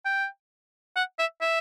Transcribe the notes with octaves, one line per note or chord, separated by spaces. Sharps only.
G5
F#5
E5
E5